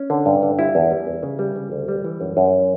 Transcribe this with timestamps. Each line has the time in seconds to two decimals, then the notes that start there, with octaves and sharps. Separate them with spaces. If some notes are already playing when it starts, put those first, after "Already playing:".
Already playing: C#4
0.10 D3
0.26 G2
0.43 D3
0.59 G3 E4
0.75 E2
0.90 G3
1.07 E2
1.23 C#3
1.39 G3
1.56 C#3
1.72 D2
1.88 G3
2.04 E3
2.21 F#2
2.37 F#2